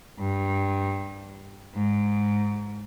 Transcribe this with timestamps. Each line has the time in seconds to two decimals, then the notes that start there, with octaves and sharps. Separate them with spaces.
0.19 G2
1.75 G#2